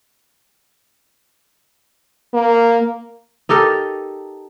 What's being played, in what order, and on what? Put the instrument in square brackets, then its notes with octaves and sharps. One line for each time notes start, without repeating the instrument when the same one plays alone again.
[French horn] A#3
[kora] D#4 G4 A4 A#4